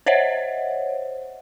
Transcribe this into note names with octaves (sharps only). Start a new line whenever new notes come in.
C5 C#5 D#5 E5 F#5